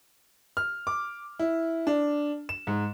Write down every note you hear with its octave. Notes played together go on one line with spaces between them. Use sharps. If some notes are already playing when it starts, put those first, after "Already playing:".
F6
D6
E4
D4
E7
G#2